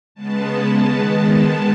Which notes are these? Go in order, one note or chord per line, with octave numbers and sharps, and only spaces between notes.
C#3 G#3 B3 A5
A5
D#3 G#3 B3